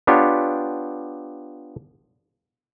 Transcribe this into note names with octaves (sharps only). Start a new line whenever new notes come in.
B3 D4 F4 G4 C#5